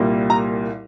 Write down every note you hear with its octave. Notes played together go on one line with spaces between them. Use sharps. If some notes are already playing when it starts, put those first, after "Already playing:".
Already playing: C2 A#2 G3 A#3
A#5